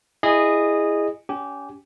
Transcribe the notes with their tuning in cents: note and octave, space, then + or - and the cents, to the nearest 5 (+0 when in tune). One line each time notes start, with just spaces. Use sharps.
E4 +0 G#4 -10 D#5 -20
C#4 +35 G4 -15 G#5 +0